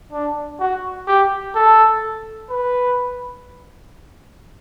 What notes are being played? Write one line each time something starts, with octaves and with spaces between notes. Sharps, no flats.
D4
F#4
G4
A4
B4